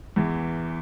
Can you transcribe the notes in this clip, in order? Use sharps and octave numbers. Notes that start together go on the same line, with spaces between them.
E2 E3